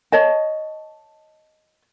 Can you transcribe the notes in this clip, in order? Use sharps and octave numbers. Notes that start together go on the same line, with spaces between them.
C#5 D#5 A5